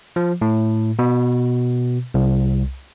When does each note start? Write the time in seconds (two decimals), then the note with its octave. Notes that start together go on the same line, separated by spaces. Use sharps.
0.16 F3
0.42 A2
0.99 B2
2.14 C2